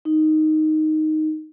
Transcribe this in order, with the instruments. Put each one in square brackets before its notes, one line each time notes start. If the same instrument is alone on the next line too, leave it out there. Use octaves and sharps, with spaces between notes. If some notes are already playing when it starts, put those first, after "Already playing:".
[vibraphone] D#4